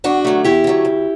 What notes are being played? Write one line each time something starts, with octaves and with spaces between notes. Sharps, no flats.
E2 D4 F#4
D3 F#3 A3
E2 E4 G4
D3 F#3 A3
D2